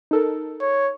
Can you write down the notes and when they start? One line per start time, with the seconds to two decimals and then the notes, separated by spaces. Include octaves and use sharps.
0.11 D#4 A4 A#4
0.61 C#5